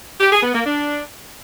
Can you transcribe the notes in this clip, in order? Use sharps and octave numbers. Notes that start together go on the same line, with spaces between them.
G4
G#4
B3
A#3
D4